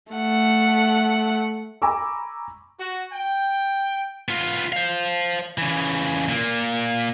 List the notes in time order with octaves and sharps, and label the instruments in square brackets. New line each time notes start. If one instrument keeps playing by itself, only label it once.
[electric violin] A3 F#5
[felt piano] G#5 A#5 B5 C#6 D6 E6
[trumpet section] F#4
G5
[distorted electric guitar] B3 F4
C5 F5
C#3 E3
A#2 A#3